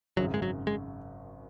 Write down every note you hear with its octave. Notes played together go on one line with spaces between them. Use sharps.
G#1 F#2 C#3 F#3
G#3
F#3
G#3